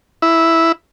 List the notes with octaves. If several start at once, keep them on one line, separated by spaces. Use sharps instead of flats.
E4